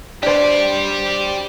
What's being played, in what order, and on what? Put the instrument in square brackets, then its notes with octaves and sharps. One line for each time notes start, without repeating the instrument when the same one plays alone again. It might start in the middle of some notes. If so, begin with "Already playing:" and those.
[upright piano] D4 C5 [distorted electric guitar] G4 D5